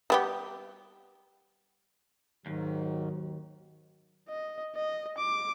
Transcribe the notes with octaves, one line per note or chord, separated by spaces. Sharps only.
G3 B3 G4
D#2 G#2 D#3 F#3
D#5
D#5
D6